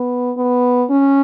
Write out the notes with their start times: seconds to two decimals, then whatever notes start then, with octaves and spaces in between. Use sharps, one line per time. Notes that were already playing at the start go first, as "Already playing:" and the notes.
Already playing: B3
0.37 B3
0.90 C#4